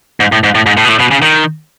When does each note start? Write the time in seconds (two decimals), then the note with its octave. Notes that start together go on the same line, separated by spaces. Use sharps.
0.20 G#2
0.32 A2
0.44 G#2
0.55 A2
0.66 G#2
0.77 A2
0.85 B2
0.89 A2
1.00 B2
1.11 C#3
1.22 D#3